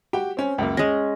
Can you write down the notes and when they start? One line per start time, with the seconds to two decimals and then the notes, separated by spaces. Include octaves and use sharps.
0.13 F#4 G4 G5
0.37 C4 C#4
0.58 C#2 F#2 A#3
0.77 G#3 C#4 A#6